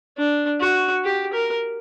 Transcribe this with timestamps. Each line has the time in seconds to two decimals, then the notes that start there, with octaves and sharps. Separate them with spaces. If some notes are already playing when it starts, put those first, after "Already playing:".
0.17 D4
0.60 F#4
1.04 G4
1.33 A#4